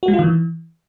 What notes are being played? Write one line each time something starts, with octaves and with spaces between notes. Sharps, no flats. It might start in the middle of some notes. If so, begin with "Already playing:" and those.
F#4
G#3
F4
D#3
E3